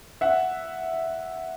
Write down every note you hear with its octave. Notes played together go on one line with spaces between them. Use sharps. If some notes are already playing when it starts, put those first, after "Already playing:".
E5 F#5